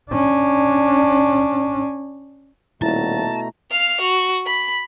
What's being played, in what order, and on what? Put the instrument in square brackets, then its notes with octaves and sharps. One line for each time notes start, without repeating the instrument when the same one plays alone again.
[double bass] C#4 D4
[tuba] D#1 [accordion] B2 A3 A#5 [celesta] E4 [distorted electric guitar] A5
[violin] F5 F7
F#4
B5